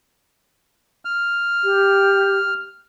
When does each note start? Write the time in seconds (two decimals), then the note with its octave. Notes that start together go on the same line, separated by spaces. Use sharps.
1.05 F6
1.64 G4